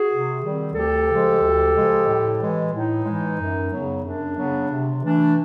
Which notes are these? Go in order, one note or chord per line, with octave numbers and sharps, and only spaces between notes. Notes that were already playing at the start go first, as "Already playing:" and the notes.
Already playing: F#4 G#4
C3
D#3 G3 C4
D2 G4 A4
C#3 F3 G#3
D2
C#3 F3 G#3
A2
E3 G#3
A2 D#4
E3 G#3
F#2
C#3 F#3 B3
F#2 D4
C#3 F#3 B3
C3
E3 A3 D4